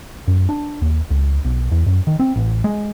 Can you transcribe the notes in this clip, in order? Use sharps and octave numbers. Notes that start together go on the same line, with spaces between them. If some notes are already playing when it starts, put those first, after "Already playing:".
F#2
D4
D#2
C#2
B1
E2
F#2
D#3
C4
A1
G#3